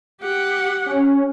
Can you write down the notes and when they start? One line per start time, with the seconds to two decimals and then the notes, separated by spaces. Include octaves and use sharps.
0.21 G4 F#5
0.86 C#4